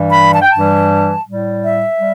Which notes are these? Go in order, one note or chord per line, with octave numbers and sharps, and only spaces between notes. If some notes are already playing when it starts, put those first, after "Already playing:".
Already playing: G2 E3 G3
B5
A5
G5
A5
G2 E3 G3
A2 G3
E5
G3